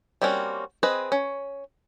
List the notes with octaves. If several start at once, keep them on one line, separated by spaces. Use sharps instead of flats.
G3 A#3 C4 C#4 F#4
C4 G#4 B4 D#5
C#4